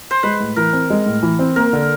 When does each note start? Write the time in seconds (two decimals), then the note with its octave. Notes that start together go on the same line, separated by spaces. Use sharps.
0.11 C5
0.23 G#3 B4
0.40 A2
0.56 E3 A#4
0.73 C4
0.90 G#3
1.06 A2
1.23 E3
1.39 C4
1.56 A#3 A#4
1.73 D3